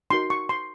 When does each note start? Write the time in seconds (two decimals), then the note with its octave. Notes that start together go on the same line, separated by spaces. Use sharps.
0.10 D#4 F#4 A#4 C6
0.30 C#6
0.49 C6